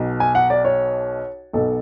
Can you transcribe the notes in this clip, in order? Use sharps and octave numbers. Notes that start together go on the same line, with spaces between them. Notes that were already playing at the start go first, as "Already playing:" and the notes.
Already playing: B1 B2
G#5
F#5
D5
C#5
B1 B2 A4